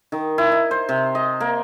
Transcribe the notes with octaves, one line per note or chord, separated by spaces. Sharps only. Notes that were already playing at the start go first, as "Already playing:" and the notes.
D#3
E4
D#5
C5
C3
D#5
A#3